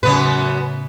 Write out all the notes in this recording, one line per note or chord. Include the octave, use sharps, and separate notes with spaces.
F#2 A2 C#3 B3 B4